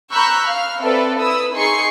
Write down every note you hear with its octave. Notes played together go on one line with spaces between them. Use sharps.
A#5 B5 C#6 E6 F#6 G6
F5 F6
C4 A4 B4 D5 E5
E4 B4 B5 D#6 E6
D#4 G#4 C6 C#6 C7 C#7